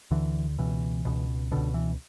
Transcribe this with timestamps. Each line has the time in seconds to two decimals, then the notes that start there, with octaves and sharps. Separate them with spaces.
0.11 D2 D3 E3
0.58 C#2 B2 E3
1.05 C#2 B2
1.52 C#2 B2 D3
1.74 E3